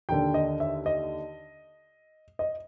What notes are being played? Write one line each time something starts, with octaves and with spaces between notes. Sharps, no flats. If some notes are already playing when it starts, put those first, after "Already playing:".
D#2 D3 G5
D#5
E5
D#5
D#5